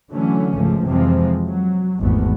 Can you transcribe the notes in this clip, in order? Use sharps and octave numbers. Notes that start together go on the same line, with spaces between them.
D3 E3 F#3 A3 C#4
G#1 C#2 F3 A3
F2 C3 E3 F3 G#3 C4
F#3
G#1 E2 A3 B3